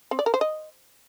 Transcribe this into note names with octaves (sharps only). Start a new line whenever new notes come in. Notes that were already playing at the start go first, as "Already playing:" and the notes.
C4
D5
A#4
C5
D#5